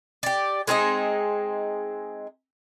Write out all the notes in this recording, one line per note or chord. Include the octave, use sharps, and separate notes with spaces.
G4 D5
G#3 C4 D#4 G#4